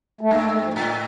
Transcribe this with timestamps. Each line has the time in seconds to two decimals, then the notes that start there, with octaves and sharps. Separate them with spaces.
0.21 A3
0.31 G2 A#3
0.42 A3
0.53 A3
0.65 F3
0.76 A2 D3